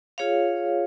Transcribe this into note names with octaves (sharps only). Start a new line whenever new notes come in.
F4 G#4 C#5 F5